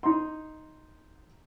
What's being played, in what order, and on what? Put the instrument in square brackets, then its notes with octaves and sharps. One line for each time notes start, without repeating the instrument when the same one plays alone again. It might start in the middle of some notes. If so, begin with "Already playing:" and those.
[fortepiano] D#4 C6